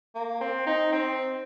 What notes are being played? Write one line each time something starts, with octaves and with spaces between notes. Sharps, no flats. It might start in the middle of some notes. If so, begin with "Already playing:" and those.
A#3
C4
D#4
C4